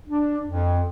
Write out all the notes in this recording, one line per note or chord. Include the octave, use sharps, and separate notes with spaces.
D4
F2